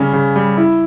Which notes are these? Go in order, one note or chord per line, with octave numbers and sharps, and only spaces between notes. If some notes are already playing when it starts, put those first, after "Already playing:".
Already playing: C#3 G3 C#4
C#3
G3
E4